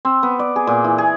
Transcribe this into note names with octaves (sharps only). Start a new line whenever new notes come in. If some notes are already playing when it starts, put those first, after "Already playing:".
C4
B3
D5
G#4
A#2
E3
G#4